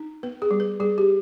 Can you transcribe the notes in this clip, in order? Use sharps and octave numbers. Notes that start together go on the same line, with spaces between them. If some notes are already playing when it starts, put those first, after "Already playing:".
Already playing: D#4
B3 B4
G#4
G3
B4
G3 G#4
G4